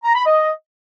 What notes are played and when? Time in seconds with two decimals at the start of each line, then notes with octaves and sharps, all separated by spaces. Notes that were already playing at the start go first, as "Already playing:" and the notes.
0.05 A#5
0.15 B5
0.26 D#5